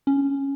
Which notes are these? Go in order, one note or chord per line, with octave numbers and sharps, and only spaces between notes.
C#4